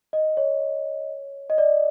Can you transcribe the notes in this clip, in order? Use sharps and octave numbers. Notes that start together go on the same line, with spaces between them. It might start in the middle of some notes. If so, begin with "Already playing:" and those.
D#5
C#5
D#5
D5